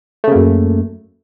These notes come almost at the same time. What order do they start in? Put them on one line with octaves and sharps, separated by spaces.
A3 C#3 A#3 F#2